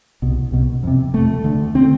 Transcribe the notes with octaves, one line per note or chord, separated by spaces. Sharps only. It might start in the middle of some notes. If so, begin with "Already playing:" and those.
C2 B2
C2 B2
F2 C3
F2 C3 A3
D2 D3
D3 C4